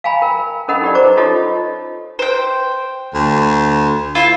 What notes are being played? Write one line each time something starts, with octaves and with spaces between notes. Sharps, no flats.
F5 G5 G#5 A#5 B5
A#4
C#4 A4 A#4 D#5 F#5 B5
D#4 G4 D5
D#4 B4 C5 A#5 D6
D#4 F4 G4 A4 C#5 D#5
C5 G5
D2
E4 F4